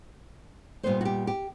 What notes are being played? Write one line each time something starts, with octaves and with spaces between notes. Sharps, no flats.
A#2 G3 B3 D#4 C5
F#4
G4
G4